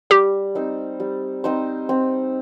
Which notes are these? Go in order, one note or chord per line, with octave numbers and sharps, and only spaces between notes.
G3 G4
C4 D#4 C5
G3
C4 D#4 C5
C4